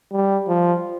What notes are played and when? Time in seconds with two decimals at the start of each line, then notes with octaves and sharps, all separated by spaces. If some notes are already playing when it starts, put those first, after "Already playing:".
0.12 G3
0.48 F3